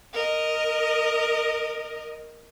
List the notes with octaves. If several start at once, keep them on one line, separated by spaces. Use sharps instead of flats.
A#4 D#5